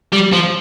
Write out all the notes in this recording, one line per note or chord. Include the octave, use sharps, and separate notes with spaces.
G3
F3